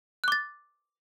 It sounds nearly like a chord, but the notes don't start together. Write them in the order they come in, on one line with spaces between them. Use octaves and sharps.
F#6 D6 A6